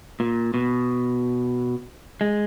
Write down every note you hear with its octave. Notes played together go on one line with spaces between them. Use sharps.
A#2
B2
G#3